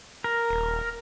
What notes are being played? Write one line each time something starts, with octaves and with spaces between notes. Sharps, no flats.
A#4
D#1